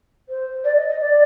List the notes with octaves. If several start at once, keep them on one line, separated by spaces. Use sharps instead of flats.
C5
D5
D#5
D#5
D5